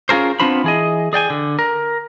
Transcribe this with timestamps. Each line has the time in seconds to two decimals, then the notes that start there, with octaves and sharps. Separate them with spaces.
0.09 C#4 F4 G#4 A#4 C5
0.40 B3 C4 D4 F4 C5 B5
0.64 E3 G#4 D#5
1.13 G#4 D5 G5 G#5
1.30 D3
1.59 A#4